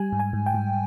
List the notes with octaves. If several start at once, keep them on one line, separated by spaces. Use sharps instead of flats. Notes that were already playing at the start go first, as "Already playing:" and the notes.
Already playing: G3 G#5
G#2
G#5
G#2
G5
G#2